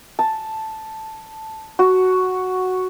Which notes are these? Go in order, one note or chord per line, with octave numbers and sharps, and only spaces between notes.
A5
F#4